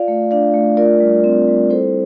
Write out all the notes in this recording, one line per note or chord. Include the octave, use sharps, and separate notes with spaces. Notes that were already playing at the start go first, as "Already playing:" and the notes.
Already playing: F4 D5 F5
A3
D4 D5 F5
A3
F4 A#4 D5
G3
C4
G3
E4 A4 C5